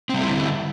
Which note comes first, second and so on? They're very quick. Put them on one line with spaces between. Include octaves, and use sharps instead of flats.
C4 G3 A3 E4 D3